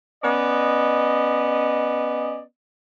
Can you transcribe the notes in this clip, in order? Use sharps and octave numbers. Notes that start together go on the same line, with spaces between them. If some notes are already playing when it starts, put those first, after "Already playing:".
B3 C#4 D5 D#5